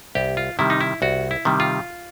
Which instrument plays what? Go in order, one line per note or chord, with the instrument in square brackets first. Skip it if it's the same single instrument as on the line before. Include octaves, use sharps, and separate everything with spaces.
[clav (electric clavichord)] C2 G4
F4
C3 D#3 G3 E4
D#4
E4
C2 F#4
E4
C3 D#3 G3
F4